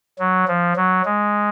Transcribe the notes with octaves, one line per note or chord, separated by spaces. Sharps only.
F#3
F3
F#3
G#3